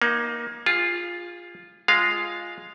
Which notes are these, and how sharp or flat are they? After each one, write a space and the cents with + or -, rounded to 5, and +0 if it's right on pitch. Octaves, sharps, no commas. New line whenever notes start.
A#3 +20 D#4 +0
F4 +0 G#4 -30
G#3 +0 F4 +0 F5 +0